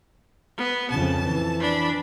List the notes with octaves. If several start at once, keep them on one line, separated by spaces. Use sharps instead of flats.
B3
F2 C#3 A5
E3
D4 B5